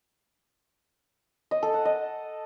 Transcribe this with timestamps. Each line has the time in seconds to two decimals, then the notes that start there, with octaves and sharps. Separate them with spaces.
1.51 D#5
1.63 A4
1.74 F#5
1.85 D#5